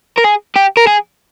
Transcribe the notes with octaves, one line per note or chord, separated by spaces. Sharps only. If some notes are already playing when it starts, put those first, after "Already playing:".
A#4
G#4
G4
A#4
G#4